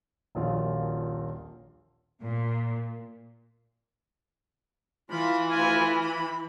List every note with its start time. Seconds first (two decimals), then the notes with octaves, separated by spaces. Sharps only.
0.35 D#1 A#1 A#2 F4 F#4
2.23 A#2
5.11 E3 F4 B5
5.50 D2 F4 G#5
6.01 B5